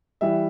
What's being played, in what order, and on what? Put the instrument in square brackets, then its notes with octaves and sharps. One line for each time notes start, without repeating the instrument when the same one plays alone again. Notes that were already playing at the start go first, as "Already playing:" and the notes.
[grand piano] E3 G3 E5